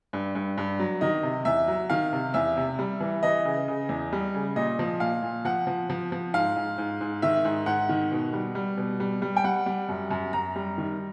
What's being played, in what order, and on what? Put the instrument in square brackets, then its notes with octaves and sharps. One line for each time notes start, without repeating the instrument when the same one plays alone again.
[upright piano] G2
G2
G2
F#3
D#3 D#5
C3
E2 E5
F#3
D#3 F5
C3
E2 E5
C3
G3
E3
E3 D#5
C#3
C#3
E2
G3
C#3
A#2 D#5
F3
A#2 F5
A#2
F3 F#5
F3
F3
F3
G#2 F5
G#2
G#2
G#2
D#3 E5
G#2
G#2 F#5
D#3
B2
G3
G3
B2
G3
G3
G5
G3 F#5
G3
F#2
F#2
F#2 A#5
G3
D#3